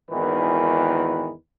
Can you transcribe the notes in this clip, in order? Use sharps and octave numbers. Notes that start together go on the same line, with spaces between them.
G#1 E2 D#3 E3 B4